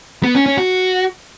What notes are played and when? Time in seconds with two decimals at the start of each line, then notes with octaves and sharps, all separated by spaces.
0.23 B3
0.35 C#4
0.46 C#4
0.58 F#4